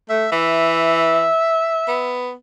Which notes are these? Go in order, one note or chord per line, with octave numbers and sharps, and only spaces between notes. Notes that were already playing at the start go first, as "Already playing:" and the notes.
A3 E5
E3 E5
B3